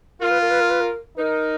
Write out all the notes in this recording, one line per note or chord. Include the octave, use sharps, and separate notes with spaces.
F4 A#4
B4
A#4
B4
A#4
B4
A#4
D#4 A#4 B4